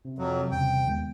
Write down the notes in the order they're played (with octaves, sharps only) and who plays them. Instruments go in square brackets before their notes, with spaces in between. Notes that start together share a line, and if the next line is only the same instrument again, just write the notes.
[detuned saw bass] C3
[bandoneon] F2 F#3
[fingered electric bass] E2 C#3 G3 [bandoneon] G5
[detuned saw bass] D#2 [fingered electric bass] D#3 G#3 B3